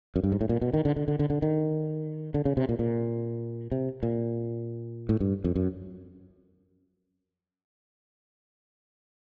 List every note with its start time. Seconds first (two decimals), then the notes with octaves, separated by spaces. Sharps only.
0.16 F#2
0.23 G2
0.32 G#2
0.41 A2
0.49 A#2
0.61 B2
0.74 D#3
0.85 D3
0.96 D3
1.08 D3
1.19 D3
1.30 D3
1.42 D#3
2.34 D3
2.45 C#3
2.57 C3
2.69 A#2
2.79 A#2
3.72 C3
4.03 A#2
5.09 A2
5.20 G2
5.44 F2
5.55 F#2